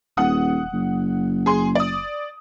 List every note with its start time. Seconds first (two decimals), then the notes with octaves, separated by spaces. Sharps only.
0.17 D#1 F#5 D#6
0.73 F#1
1.46 G#4 C6
1.75 D5 D#6